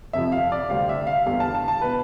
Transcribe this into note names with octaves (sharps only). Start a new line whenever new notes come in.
F2 C3 F3 E5
F5
D5
D2 C3 G3 C4 F5
E5
F5
E2 D3 G3 B3 F5
A5
A5
A5
B2 B3 B4